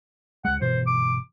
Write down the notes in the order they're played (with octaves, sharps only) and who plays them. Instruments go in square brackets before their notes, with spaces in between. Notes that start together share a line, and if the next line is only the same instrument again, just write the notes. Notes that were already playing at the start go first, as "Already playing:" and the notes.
[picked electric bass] C#2 G#3 [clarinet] F#5
[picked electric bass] G1 B2 E3 [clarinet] C5
[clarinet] D6